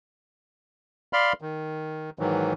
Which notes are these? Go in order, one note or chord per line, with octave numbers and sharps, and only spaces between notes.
D5 F5 B5 C6 F6
D#3
G#2 D#3 E3 F#3